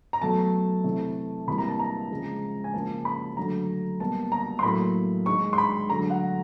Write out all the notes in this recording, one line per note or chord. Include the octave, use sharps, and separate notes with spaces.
A#5
B2 F#3 A3 A5
C3 E3 A3
C3 E3 G3 A#3 B5
A#5
A5
A#5
C#3 F3 G#3
G#5
C#3 F3 A#3 A5
B5
D3 F#3 A3 A#5
B2 G3 A#3 A5
A#5
C6
A2 F#3 A#3 B5
D#3 G#3 C#6
C6
B5
D3 F#3 A3 A#5
F#5